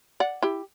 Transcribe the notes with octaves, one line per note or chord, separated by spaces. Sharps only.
D5 F#5
E4 G4